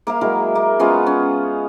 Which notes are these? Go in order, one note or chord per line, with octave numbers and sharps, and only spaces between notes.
A#3 A#4 E5 F5
F#3 G#3 E4 A#4
A#3
G#3 B3 C#4 F4
C#4